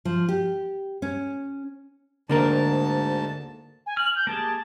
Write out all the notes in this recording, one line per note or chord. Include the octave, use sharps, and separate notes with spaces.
F3
G4
C#4
D2 G#2 D3 A#3 A#4 A5
G#5
F6 F#7
G6
A#3 G4 G#4 A5